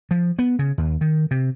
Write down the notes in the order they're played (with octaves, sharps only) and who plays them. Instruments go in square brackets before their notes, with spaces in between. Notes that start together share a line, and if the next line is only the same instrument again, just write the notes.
[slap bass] F3
B3
C#3
D#2
D#3
C3